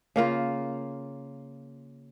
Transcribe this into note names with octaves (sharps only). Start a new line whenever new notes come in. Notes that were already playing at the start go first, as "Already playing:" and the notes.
C#3 A#3 F4